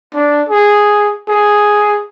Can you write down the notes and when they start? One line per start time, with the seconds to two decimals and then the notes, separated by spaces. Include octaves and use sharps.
0.14 D4
0.49 G#4
1.29 G#4